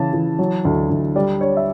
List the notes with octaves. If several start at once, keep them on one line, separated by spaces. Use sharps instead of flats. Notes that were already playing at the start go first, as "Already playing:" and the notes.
Already playing: C#3 E3 A5
E3
F#3
D2
D2
G3 D5
D4 C#5
E5